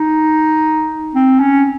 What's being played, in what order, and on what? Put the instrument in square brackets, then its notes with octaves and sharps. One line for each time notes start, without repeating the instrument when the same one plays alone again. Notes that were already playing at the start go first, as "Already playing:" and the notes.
Already playing: [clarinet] D#4
C4
C#4